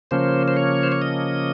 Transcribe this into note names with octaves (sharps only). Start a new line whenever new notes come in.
C#3 F3 A#3 C#4 C5
C5
C#5
C5
C#5
D#5